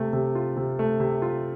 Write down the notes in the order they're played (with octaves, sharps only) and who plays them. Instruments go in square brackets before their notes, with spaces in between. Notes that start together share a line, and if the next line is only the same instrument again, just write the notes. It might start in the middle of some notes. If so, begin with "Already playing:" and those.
Already playing: [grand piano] C3 A3
C3
F4
C3
A3
C3
F4